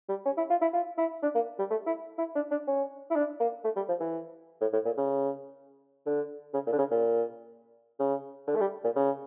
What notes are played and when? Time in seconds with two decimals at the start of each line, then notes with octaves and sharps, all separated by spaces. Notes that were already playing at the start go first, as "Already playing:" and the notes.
0.09 G3
0.26 C#4
0.37 E4
0.50 F4
0.62 E4
0.74 F4
0.98 E4
1.23 D4
1.35 A#3
1.59 G3
1.70 A3
1.87 E4
2.19 E4
2.35 D4
2.51 D4
2.68 C#4
3.11 E4
3.16 D4
3.40 A#3
3.64 A3
3.76 G3
3.89 F3
4.00 E3
4.61 A2
4.73 A2
4.85 A#2
4.97 C#3
6.06 D3
6.54 C#3
6.67 A#2
6.73 D3
6.78 C#3
6.91 A#2
8.00 C#3
8.47 D3
8.56 A3
8.61 G3
8.84 A#2
8.96 C#3